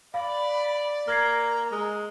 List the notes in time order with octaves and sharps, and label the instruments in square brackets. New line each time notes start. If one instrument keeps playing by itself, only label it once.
[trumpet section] D5 [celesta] F5 [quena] B5
[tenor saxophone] A#3 [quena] A#5 [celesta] F6 G#6 C7
[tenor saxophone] G#3